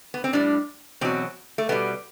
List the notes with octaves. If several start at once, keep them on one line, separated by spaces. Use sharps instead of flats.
B3
C4
A2 G3 D4
E2 B2 F#3 C4
A3
B2 G3 B3